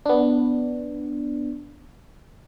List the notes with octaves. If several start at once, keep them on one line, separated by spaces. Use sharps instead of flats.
B3 D4